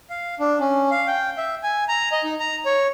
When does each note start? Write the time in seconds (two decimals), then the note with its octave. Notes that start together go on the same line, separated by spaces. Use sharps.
0.10 F5
0.39 D4
0.60 C#4
0.91 F5
1.07 G5
1.37 E5
1.63 G#5
1.88 A#5
2.12 D#5
2.24 D#4
2.40 A#5
2.66 C#5